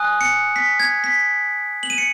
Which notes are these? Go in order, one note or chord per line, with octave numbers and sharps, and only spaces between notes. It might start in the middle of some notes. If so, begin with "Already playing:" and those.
Already playing: G#5 D#6 F#6
C#7
B6
G#6
B6
F#7
D#7
C#7